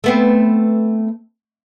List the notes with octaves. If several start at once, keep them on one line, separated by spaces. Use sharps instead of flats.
A3 B3 C4